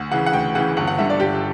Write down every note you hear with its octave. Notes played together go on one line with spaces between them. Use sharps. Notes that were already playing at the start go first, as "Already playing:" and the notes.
Already playing: D2 F#5
C#3 E3 F#5
F#5
D2 G5
C#3 E3 F#5
G1 F#5
F#5
G2 D3 E5
D5
G1 G4